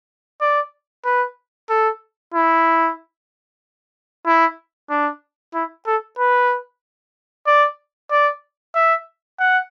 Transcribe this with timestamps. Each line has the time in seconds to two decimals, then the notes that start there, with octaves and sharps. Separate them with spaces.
0.41 D5
1.05 B4
1.70 A4
2.34 E4
4.26 E4
4.90 D4
5.54 E4
5.87 A4
6.19 B4
7.47 D5
8.11 D5
8.75 E5
9.40 F#5